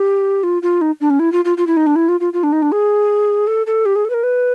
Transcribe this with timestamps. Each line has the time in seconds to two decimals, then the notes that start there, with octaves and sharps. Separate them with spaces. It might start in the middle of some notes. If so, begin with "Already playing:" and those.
Already playing: G4
0.43 F4
0.62 F4
0.81 D#4
1.01 D4
1.10 C#4
1.19 E4
1.32 F4
1.45 F4
1.57 F4
1.67 E4
1.77 D#4
1.87 D4
1.96 E4
2.08 F4
2.20 F4
2.33 F4
2.43 D4
2.52 D#4
2.62 D4
2.72 G#4
3.47 A4
3.67 A4
3.86 G4
3.96 G#4
4.05 A4
4.10 B4
4.14 A#4
4.23 B4